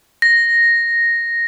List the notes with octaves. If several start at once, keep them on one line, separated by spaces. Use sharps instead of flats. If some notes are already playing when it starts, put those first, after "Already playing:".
A#6